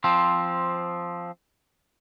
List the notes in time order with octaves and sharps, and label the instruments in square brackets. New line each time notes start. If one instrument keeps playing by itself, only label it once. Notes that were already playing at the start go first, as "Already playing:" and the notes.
[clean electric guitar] F3 C4